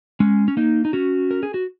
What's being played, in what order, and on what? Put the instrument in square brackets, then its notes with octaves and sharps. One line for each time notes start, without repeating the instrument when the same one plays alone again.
[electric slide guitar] G#3 C#4
C#4
A#3 D#4
D#4
C#4 F#4
A#4
G#4
F#4